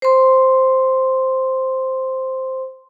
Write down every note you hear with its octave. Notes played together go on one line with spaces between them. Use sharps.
C5 C6